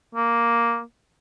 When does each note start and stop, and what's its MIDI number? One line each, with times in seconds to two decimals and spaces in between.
0.15 0.80 58